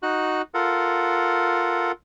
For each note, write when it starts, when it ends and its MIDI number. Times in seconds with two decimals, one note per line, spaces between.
0.03 0.42 63
0.03 0.42 66
0.03 0.42 90
0.54 1.92 65
0.54 1.92 69
0.54 1.92 70
0.54 1.92 78